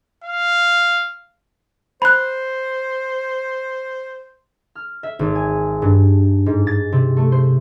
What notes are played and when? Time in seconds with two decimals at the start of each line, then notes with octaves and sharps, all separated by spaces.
0.24 F5
2.02 C5 B5 F#6
4.75 F6
5.03 E5
5.19 G#1
5.35 G#5
5.82 G2
6.46 G#2
6.67 A6
6.92 C3
7.17 A3
7.32 C5